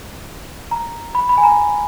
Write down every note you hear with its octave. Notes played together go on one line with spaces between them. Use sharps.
A#5
B5
B5
G#5
A#5